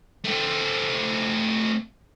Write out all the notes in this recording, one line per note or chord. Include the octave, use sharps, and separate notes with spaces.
A3 C4